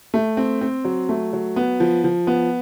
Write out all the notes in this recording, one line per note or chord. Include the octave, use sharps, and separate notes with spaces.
A3
C4
C4
F#3
A3
F#3
B3
F3
F3
B3